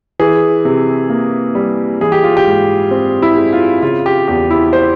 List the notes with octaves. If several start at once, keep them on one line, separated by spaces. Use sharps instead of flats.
E3 G#4
C3
A#3
G3
E3 G#4
G4
F4
G4
G#2
C4
E4
G#3
F4
C#3 F4
G4
E2 G4
E4
C5